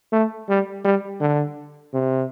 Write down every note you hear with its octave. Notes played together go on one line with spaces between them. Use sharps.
A3
G3
G3
D3
C3